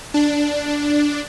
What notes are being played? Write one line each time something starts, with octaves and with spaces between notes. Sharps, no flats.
D4